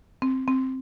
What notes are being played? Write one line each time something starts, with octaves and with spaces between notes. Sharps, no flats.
C4
C4